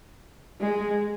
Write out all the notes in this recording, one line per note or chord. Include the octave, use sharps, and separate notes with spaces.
G#3